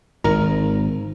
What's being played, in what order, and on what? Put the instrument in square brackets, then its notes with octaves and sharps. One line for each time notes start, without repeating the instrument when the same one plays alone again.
[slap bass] G#1 [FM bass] D#3 [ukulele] A#4